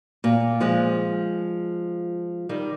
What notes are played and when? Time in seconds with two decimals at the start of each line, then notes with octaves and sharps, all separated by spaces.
0.24 A#2
0.60 F3 G#3
2.49 D#3 G3